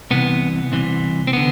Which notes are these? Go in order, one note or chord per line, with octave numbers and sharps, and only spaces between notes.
C2 C3 E3 B3
C2 C3 E3
C4
D3 B3